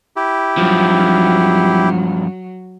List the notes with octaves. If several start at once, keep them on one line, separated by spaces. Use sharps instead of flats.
E4 G4
G2 F3 F#3